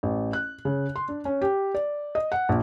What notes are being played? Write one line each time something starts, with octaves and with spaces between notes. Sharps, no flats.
A1
F#6
C#3
C6
D4
C#4
G4
D5
D#5
F#5
A#1